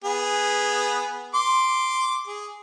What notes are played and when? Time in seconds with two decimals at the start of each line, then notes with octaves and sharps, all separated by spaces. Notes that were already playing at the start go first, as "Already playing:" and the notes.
0.04 B3 G#4
1.34 C6 D6
2.27 G#4